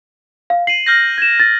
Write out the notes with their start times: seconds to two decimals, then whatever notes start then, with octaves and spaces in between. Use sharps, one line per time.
0.50 F5
0.67 C7 D#7 F#7
0.86 F6 G6 A#6
1.18 G#6 E7
1.40 A6